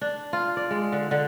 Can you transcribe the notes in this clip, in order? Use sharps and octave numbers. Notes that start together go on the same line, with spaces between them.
D4
F4
D5
G#3
D3
D3